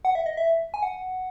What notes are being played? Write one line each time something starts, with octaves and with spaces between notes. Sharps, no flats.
F#5
E5
D#5
E5
G#5
F#5